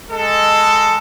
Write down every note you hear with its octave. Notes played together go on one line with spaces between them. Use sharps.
G#3 A4